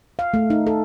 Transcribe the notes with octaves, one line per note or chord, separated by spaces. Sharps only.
F5
A3
D#4
A4